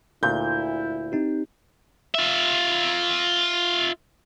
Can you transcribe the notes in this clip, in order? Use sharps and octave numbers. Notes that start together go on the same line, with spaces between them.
D2 A#2 E4 G6
C4 D#4 G4
F4 E5